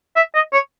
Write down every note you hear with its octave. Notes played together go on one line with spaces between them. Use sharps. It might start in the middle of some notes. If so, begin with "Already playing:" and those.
E5
D#5
C#5